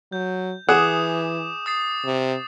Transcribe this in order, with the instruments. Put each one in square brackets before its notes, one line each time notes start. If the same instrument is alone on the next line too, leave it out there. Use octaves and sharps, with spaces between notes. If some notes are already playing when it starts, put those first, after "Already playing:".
[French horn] F#3 [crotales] G6
[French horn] E3 [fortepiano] G#4 F#5 [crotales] D6 D#6 E7
[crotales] D#6 A6 C7
[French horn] C3